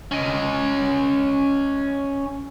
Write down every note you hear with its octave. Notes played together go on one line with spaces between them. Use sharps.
C#4 D#5